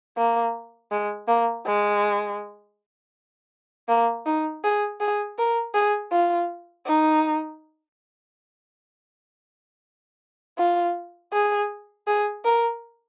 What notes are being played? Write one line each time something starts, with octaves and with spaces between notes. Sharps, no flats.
A#3
G#3
A#3
G#3
A#3
D#4
G#4
G#4
A#4
G#4
F4
D#4
F4
G#4
G#4
A#4